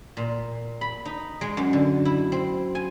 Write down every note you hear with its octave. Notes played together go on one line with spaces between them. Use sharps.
A#2
B5
D#4
G#3
F#2
D3
E4
C4
G#5